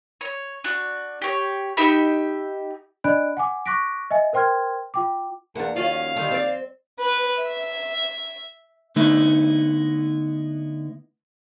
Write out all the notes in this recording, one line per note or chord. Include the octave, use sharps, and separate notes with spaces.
C#5
D4 F#4
G4 C#5
D#4 G4 E5 B5
D4 D5 D#5 B5 F#6 D7
F#5 G#5 D6
C#6 D6 F#6 A#6 B6 D7
D#5 E5 G#5
A#4 C5 G5 C6 F6 G#6
F4 G5 D6
E2 A#3 D4 F#5
D#2 F3 C#4 F4 F#4 F5
D3 D#3 G3
C4 D5
B4
E5
D3 A3 B3 D#4 E4